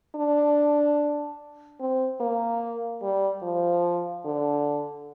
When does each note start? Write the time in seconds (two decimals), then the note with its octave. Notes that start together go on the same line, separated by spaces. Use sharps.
0.16 D4
1.80 C4
2.20 A#3
3.02 G3
3.43 F3
4.25 D3